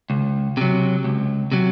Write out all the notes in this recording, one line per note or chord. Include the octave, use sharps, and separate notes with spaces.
C#2
C3 F#3
C#2
C3 F#3